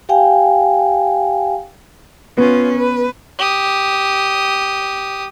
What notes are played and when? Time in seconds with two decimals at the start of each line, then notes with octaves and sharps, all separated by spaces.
0.09 G4 F5 G5 G#5
2.37 B3 C#4 F4
2.75 B4
3.38 G4 D#6